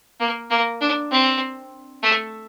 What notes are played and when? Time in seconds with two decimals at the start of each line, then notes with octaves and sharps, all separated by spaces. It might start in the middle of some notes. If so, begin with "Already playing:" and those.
0.20 A#3
0.50 A#3
0.81 D4
1.11 C4
2.03 A3